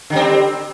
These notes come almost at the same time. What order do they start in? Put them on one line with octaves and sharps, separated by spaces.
D3 G3 C4